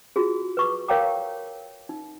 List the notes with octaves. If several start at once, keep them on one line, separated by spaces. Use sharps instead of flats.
F4 F#4 G#4
B4 C#6 D6
A#4 C#5 F5 G5 A#5 D6
D#4